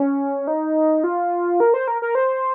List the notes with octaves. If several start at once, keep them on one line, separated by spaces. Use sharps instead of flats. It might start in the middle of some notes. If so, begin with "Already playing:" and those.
Already playing: C#4
D#4
F4
A#4
C5
A#4
A#4
C5